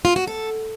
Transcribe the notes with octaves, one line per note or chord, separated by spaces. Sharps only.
F4
F#4
A4